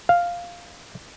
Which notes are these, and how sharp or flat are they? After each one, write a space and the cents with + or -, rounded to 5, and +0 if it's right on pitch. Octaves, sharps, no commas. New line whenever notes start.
F5 +0